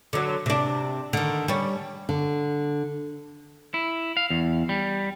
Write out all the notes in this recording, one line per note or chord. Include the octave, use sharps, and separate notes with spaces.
D3 F#3
C3 D4
D3 D#3
G3 C#4
D3
E4
F5
E2
G3